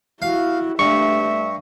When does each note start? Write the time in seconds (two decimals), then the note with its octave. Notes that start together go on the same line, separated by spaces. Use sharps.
0.22 E4 F#4 F5
0.79 G2 A3 E5 C#6